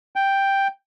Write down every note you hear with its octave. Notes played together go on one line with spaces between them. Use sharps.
G5